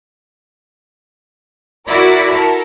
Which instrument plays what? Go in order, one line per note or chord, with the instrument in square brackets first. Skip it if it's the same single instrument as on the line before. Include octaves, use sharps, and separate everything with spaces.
[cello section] E4 F#4 [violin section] A#4 D5
[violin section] A4 A#4